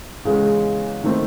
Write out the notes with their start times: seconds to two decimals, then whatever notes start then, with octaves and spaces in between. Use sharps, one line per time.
0.25 E2 C#3 E3 G#3
1.04 D#3 A3 C4